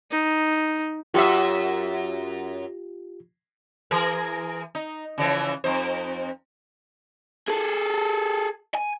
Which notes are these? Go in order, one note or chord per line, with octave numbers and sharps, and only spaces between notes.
D#4
F#2 F4 G4 E5
E3 G#4 A#4
D#4
C#3 E3 F3
F2 D#4 C5
G#4 A4
G#5